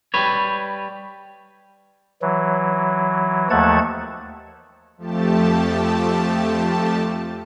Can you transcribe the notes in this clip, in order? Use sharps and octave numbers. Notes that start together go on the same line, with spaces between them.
G3 B4 C#5
E3 F#3
D#2 F3 A3 F#5 A5 G#6
F2 F3 A3 G4 A5